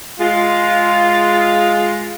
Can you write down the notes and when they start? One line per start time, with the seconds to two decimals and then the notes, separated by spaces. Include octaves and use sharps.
0.19 G#3 F4